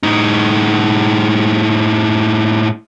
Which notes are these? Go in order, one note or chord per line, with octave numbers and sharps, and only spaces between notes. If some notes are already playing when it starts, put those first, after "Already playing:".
A2 D#4